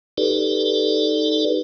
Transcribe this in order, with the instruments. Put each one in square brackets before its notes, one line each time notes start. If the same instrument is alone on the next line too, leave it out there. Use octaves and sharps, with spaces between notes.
[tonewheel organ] D#4 G4 A4 B4 D5